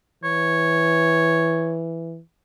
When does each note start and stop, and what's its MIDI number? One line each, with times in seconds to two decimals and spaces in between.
0.24 2.20 52
0.24 1.77 73